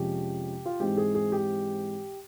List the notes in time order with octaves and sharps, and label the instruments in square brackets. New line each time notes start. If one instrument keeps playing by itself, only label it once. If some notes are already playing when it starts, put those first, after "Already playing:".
Already playing: [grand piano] F2 C3 F3 G#3 C#4 G4
F4
G#2 E3 G#3 C4 G4
G#4
G#4
G4